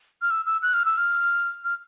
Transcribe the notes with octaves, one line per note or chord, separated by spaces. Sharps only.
F6
E6
E6
F#6
F6
E6
F6
F6